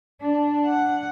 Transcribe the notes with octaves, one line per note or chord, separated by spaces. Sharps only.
D4
F#5